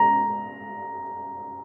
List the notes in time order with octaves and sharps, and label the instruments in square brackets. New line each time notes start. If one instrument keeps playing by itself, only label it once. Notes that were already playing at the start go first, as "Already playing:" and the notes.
Already playing: [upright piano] A#5